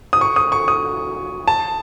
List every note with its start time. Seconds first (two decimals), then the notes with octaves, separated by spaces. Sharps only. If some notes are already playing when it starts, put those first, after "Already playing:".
0.13 D#6
0.21 C#6
0.36 D#6
0.52 C#6
0.68 D#6
1.47 A5